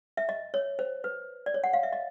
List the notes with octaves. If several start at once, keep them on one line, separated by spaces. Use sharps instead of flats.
E5
D#5
C#5
C5
B4
D5
C#5
F#5
F5
E5
D#5